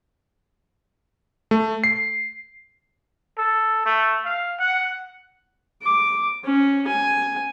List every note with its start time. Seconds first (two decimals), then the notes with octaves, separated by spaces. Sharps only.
1.51 A3
1.84 C7
3.38 A4
3.86 A3
4.25 F5
4.59 F#5
5.83 D6
6.45 C#4
6.88 G#5